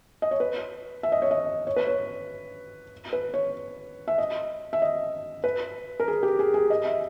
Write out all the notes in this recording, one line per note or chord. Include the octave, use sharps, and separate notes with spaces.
D#5
C#5
B4
E5
D#5
C#5
D#5
C#5
B4
C#5
B4
C#5
E5
D#5
E5
D#5
B4
A#4
G#4
G4
G#4
G#4
D#5
E5